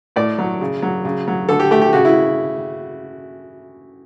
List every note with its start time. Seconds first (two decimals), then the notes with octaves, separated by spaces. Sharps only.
0.16 A2 D5
0.38 F#3
0.61 C#3
0.82 F#3
1.05 C#3
1.28 F#3
1.49 D3 A4
1.60 G4
1.71 A3 G4
1.82 G4
1.93 C#3 F#4
2.05 E4